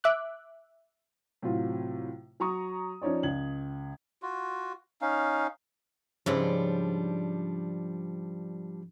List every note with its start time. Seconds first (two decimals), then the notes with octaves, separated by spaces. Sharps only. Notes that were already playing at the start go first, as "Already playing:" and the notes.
0.04 E5 D6 F#6
1.42 A2 C3 F#3 F4
2.40 F#3 A#5 C#6 D#6
3.02 F3 C#4 D#4 C#5 D5
3.23 C#2 G#6 F#7
4.22 F4 F#4
5.01 C#4 D#4 F5
6.26 G#2 C#3 F3 G3 D4 E4